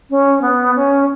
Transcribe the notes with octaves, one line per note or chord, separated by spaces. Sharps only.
C#4
B3
C#4